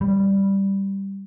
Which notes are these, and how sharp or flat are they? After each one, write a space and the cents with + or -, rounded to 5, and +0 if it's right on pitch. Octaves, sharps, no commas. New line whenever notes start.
G3 +0